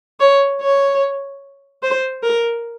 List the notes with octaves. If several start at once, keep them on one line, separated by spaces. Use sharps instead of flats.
C#5
C#5
C5
A#4